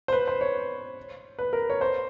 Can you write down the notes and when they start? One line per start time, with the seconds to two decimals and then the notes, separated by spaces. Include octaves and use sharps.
0.08 C5
0.12 B4
0.28 C5
0.41 C#5
1.39 B4
1.53 A#4
1.70 C#5
1.81 C5